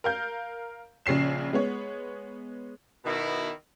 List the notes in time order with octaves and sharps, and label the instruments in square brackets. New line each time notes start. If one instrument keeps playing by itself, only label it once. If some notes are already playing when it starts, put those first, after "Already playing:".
[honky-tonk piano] A#4 F5 G6
A#1 C#3 C#4 C7 E7
G#3 B3 C#5
[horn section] B2 D#3 E4